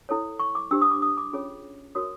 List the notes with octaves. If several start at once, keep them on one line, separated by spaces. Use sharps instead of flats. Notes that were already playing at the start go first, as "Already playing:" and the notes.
E4 A4 C#5
C#6
D6
D4 G4 C5 E6
D#6
D6
D#6
D6
C#4 F4 G#4 C#5
F#4 A#4 C#5 D#6